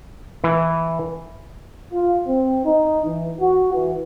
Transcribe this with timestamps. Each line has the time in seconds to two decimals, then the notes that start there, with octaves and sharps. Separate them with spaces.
0.44 E3
1.92 F4
2.27 C4
2.65 D#4
3.06 E3
3.40 F#4
3.73 E3